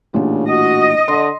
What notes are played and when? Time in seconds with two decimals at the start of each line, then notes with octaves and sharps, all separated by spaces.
0.14 A1 A#2 C#3 D4
0.48 F#4 D#5
1.08 D3 C6